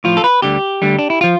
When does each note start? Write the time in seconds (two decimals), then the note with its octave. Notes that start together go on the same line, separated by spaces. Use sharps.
0.04 A2 F3 F4
0.17 A4
0.24 B4
0.42 D2 D3 G3 G4
0.82 D2 D3 G3
0.99 D4
1.10 E4
1.21 F3 F4